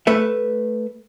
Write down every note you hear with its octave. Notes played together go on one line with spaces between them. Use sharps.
A3 B4 E5